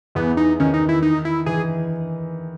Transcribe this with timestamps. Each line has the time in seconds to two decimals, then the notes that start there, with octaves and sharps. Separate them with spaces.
0.15 E2 E3 B3
0.37 D#4
0.60 D#3 C#4
0.74 D#4
0.89 E4
1.02 D#4
1.25 E4
1.46 E3 G#4